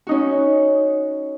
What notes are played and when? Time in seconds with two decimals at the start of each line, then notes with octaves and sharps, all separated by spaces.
0.07 C#4 D#4 F#4